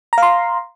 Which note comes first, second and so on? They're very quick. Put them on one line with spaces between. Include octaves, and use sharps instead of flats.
A#5 F5 C6